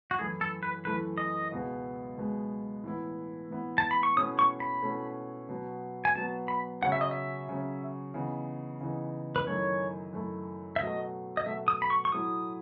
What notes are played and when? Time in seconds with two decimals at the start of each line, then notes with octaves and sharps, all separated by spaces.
0.11 F#4
0.18 F#2 E3 A3 E4 G#4
0.41 A4
0.63 B4
0.85 F#2 E3 A3 E4 B4
1.18 D#5
1.52 C#2 B2 G#3 B3
2.17 C#2 B2 G#3 B3
2.84 A2 E3 B3 E4
3.50 A2 E3 B3 E4
3.78 A5
3.91 B5
4.03 C#6
4.16 B2 A3 C#4 E4 D#6
4.39 C#6
4.60 B5
4.83 B2 A3 C#4 E4
5.49 B2 F#3 B3
6.05 G#5
6.15 B2 F#3 B3 A5
6.48 B5
6.82 C#3 F#3 C#4 F#5
6.92 E5
7.01 D#5
7.11 E5
7.49 C#3 F#3 C#4
8.14 C#3 E3 B3 D#4
8.80 C#3 E3 B3 D#4
9.36 B4
9.47 F#2 D#3 A3 E4 C#5
10.13 F#2 D#3 A3 E4
10.76 E5
10.80 B2 F#3 A3 D#5
11.37 D#5
11.46 B2 F#3 A3 E5
11.68 D#6
11.82 B5
11.90 C#6
12.05 C#6
12.12 A2 F#3 A3 E4 D#6